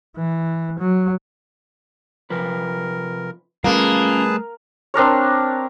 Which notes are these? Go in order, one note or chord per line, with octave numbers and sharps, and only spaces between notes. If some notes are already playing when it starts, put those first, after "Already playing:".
E3
F#3
C3 F3 A#4 B4
G3 A3 A#3 C#4 F4 G#4 B4 A5
C4 D4 A#4 C#5